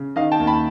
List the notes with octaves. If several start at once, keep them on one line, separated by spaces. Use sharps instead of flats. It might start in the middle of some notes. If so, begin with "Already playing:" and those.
Already playing: C#3
D#3 D#5 F5
G5 A5
D#2
A5 B5